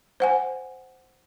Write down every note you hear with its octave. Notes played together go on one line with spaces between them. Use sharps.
C5 F#5 G#5